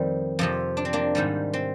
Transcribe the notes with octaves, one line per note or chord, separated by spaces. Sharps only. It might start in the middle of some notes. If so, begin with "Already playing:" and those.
Already playing: F2 D#3 G3 C4
F2 C3 F3
D4
C4
A#3 D4
G#2 D#3 G3
C4